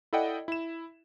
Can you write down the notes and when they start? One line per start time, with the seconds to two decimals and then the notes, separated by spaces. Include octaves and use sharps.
0.13 E4 A4 D5 D#5 F#5 G5
0.48 E4 E7